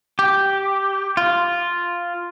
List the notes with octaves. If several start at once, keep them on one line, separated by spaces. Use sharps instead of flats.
G4
F4